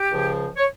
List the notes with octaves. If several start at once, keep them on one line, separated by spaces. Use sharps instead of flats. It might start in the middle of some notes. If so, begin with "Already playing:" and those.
Already playing: G4
C#2 C#3 F3
C#5